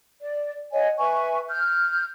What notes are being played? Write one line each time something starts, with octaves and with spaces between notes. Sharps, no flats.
D5
C#5 D#5 F#5 G#5
B4 E5 G#5 C#6
F6 G6